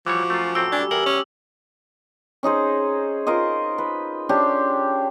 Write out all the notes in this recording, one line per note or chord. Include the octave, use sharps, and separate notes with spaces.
E3 F3 G3 F#4 C#5 D6
F#2 A3 F4
A2 A3 C4 G5 E6
G3 D4 G#5
E2 G4 A#4 F#7
C#4
C#4 D#4 G#4 C5
F4 A#4 C5 D#5
B4
C#4 D4 G4 C5